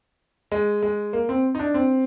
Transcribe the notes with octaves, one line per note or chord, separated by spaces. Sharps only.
G#3
G#3
A#3
C4
D#4
D4
C4